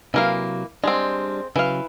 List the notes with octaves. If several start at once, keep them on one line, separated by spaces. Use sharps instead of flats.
C3 E3 F#3 A#3 F5
G3 G#3 C4 D4
C#3 E3 F#3 F5